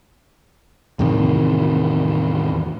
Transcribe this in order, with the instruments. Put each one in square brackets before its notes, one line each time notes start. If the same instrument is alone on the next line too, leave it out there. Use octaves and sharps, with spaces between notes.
[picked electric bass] E2 A2 C3 D#3